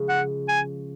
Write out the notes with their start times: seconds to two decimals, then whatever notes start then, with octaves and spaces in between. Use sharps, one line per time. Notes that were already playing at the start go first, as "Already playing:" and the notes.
Already playing: C#3 F3 G#3 C#4
0.09 F#5
0.49 G#5